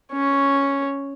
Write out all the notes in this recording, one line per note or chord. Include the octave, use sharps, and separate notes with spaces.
C#4 C#5